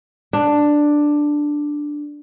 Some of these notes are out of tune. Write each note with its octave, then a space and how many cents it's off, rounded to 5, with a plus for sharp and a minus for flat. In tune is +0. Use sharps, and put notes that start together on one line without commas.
D4 +5